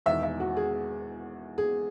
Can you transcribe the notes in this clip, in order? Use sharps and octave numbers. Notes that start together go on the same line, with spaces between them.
E1 E2 D#3 E5
E5
F#4
G#4
G#4